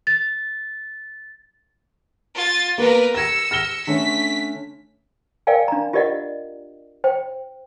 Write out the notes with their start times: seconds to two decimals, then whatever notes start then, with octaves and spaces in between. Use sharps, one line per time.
0.07 A6
2.35 F4 A6
2.78 A#3 B3 A#4 B4
3.15 E6 G#6 A#6 C#7
3.51 F6 A#6 G7
3.87 D3 A3 C#4 B6
5.47 A#4 D5 F5 G5 G#5
5.68 D4 A#5
5.93 F4 G4 A#4 D5 D#5 F#5
7.04 C5 G5